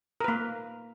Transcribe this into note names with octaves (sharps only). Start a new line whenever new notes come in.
A#3 A#4 B4